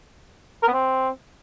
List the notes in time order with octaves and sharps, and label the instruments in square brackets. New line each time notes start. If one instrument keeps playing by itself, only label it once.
[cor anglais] A#4
B3
C4